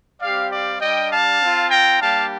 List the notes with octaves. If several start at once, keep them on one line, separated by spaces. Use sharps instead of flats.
G3 C4 G4 D5 F5
D5 F5
G3 D4 G4 D#5 G5
F5 A5
C4 F4
G5 A#5
G3 A#3 D4 G4 F5 A5